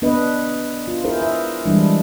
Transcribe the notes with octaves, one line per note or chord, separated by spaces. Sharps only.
B3 D4 B4 D#5
F4
E4 G#4 A#4 C5
B4 E5
E3 G3 G#3 D4 E4